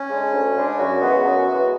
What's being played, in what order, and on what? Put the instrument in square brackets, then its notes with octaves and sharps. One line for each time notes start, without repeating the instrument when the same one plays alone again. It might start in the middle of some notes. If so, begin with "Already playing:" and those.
Already playing: [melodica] C#4
[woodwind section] C#3 G#3 D4
D2
C#3 G#3 D4
[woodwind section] F#2 [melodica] F#4
[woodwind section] C#3 E3 G#3 B3
F#2
C#3 E3 G#3 B3